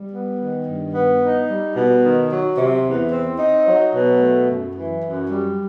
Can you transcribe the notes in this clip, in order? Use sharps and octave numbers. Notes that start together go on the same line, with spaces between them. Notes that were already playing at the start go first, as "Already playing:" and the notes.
Already playing: G3
B3
D#3
G2
B3
D#4
G3
B2
D#3
F#3
C3
E2
C4
D#4
F#3
B2
A3
F#2
E3
F#2
G3